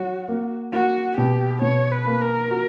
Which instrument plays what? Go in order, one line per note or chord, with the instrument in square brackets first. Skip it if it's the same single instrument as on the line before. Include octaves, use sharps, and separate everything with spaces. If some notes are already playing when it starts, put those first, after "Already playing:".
Already playing: [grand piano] F#3 [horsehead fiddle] F#4
[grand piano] A#3
[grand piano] A#3 [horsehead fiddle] F#4
[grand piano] B2 [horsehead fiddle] G4
[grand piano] B2 [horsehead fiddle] C#5
[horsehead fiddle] B4
[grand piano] A#3
[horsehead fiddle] A#4
[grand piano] F#4